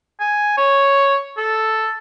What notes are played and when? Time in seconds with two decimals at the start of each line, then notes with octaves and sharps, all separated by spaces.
0.20 G#5
0.58 C#5
1.37 A4